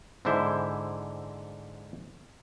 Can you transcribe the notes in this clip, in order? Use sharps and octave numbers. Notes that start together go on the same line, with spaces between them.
G#2 D3 E3 E4 C5 E5